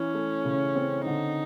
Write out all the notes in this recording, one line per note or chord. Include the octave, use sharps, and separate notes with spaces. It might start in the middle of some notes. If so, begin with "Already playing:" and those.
Already playing: E3 C#4
A3
C#3
C4
D3 D#4